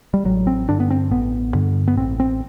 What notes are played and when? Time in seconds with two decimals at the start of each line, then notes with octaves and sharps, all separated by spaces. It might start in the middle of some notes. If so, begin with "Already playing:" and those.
0.14 G3
0.25 A1 F#3
0.47 C4
0.69 G2 D3 D4
0.80 B3
0.90 C4
1.11 A1 B3
1.54 G2 D3
1.88 B3
1.97 A1 C4
2.20 C4